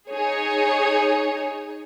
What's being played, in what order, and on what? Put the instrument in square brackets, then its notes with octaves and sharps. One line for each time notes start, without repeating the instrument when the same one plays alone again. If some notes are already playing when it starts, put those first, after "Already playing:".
[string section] D#4 G#4 C#5